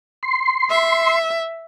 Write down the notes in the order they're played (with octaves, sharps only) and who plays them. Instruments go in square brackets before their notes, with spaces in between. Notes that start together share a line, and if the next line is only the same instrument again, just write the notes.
[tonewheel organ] C6
[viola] E5